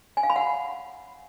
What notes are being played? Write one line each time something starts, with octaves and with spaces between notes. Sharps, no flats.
G#5
F5
B5
F#5